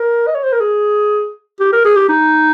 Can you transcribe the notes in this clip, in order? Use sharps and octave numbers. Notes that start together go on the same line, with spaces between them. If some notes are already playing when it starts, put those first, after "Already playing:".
Already playing: A#4
D#5
C#5
C5
A#4
G#4
G4
A#4
G#4
G4
D#4